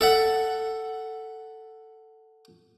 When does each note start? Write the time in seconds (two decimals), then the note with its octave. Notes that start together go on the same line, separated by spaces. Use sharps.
0.01 A4 E5 F#5